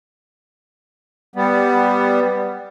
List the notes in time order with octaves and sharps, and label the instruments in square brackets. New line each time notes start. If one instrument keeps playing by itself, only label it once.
[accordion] G3 B3